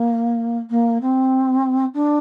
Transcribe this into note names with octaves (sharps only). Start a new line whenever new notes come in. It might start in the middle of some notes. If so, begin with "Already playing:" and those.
Already playing: A#3
A#3
C4
D4